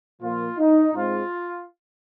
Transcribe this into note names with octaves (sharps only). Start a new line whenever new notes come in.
A#2 F3 A#3 F4
D#4
G#2 G#3 C4 F4